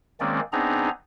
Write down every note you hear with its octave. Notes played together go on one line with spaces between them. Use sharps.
D#3 G#3 A#3 C4 C#4 D5
B3 C4 D4 D#4 G#4 A#5